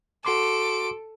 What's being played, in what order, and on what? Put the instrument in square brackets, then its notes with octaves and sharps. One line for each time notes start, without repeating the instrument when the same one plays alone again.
[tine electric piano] F#4 C6 D6 [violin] A4 D7